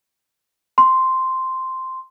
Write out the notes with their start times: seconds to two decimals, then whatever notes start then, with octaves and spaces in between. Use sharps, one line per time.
0.78 C6